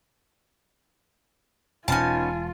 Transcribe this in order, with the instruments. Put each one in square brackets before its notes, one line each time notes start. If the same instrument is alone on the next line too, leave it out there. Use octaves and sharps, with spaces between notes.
[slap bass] E1 B2 [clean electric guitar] B3 C#4 D#4 [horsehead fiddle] F4 [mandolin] G#5 A5